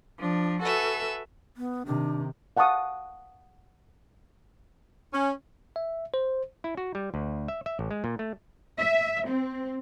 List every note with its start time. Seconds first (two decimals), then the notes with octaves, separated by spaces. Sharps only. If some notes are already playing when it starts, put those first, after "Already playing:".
0.18 F3 D4
0.61 F#4 A4 B4 E5 G#5
1.57 B3
1.86 C3 D#3 D4
2.57 F5 F#5 A5 C#6 D#6
5.13 C#4
5.76 E5
6.14 C5
6.64 E4
6.77 F#4
6.95 G3
7.14 D2
7.48 E5
7.66 E5
7.79 A1
7.91 G#3
8.04 A#2
8.19 A3
8.79 E5
9.28 C4